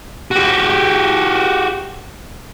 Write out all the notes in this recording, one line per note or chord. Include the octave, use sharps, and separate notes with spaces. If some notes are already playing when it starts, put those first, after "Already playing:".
F#4 G4